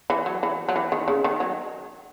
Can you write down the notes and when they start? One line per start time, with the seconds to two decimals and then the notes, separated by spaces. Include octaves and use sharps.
0.10 E3
0.26 F#3
0.43 E3
0.69 F#3
0.76 E3
0.92 D#3
1.08 C#3
1.24 D#3
1.40 F#3